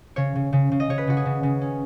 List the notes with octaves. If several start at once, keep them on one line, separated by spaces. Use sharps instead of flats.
C#3 C#5
C#3
C#3
C#3
D#5
C#3 C#5
B4
C#3 F#4
G#4
C#3
C#3
C#4